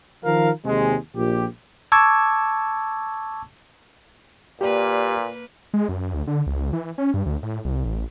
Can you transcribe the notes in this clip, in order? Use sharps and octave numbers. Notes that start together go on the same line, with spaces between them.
D#3 F3 A#4 F5
D#2 C3 G#3
A#1 A#2 G4
A5 C#6 D6 E6 G#6
A#2 A#3 G4 B4 D5
G#3
F#2
D2
D3
C#2
E3
C#4
G2
D2
A2
C2
A1